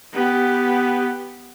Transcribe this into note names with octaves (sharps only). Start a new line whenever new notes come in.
B3 G4